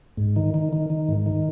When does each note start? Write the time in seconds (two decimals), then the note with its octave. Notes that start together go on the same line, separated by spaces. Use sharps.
0.17 G#2
0.36 D#3
0.54 D#3
0.73 D#3
0.90 D#3
1.08 G#2
1.26 D#3